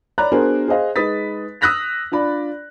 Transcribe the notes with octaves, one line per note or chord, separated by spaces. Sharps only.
C#5 D5 A#5 B5 F#6
B3 D4 F#4 G#4 A#4 C5
G#4 C5 D#5 F5
G#3 D#4 B4 D#6 A6 B6
D#6 E6 F#6 A#6 B6 F7
D4 F4 D5 B5